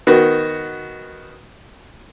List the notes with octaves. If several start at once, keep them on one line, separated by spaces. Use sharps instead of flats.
D#3 B3 F#4